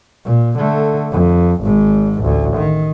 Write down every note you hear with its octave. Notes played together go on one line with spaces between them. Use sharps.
A#2
D3 A3
F2
G#1 G#2
A1 D2
D#3